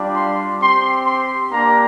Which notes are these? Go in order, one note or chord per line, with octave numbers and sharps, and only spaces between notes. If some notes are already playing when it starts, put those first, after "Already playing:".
Already playing: G3 D4 F4
C6
C4 G4 C6
C6
A#3 D4 G4 A#5